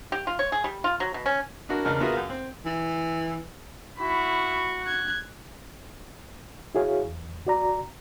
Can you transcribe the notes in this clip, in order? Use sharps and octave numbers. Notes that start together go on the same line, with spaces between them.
G4
F4
C#5
G#4
G3
F4
F#3
B2
C#4
D4 E4 F#4 A#4
E2 C#3 A#4 D#5 A5 F6
B3 F4 F#4 G#4 A#4 E5
F#2 F5
C4
E3
E4 F#4 B5 C#6
F#6 G#6
E4 F#4 G#4 C#5 F5
E2
D2 F#4 D5 A#5